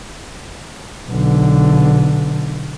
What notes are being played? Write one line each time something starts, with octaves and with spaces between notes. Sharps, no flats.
B1 D3